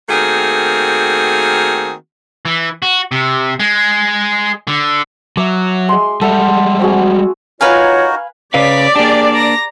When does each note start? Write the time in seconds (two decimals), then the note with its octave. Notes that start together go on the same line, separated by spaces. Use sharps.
0.09 D#3 A3 A#3 C4 F#4 G#4
2.45 E3
2.82 F#4
3.12 C3
3.60 G#3
4.68 D3
5.37 F#3 E5 D6
5.89 G#3 C6
6.21 G3 G#3 A4 E5 F#5
6.79 C4 F#4 G#4
7.61 D#4 F4 F#4 A#4 B4 C#5 F5 G#5
8.54 C#3 B4 C#5 D5 F5 B6
8.96 A#3 D4 G4 G#4
9.33 A#5 A#6